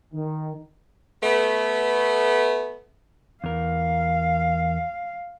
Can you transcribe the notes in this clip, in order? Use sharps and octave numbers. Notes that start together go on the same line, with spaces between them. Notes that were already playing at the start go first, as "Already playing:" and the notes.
D#3
A3 B3
E2 A#4 F5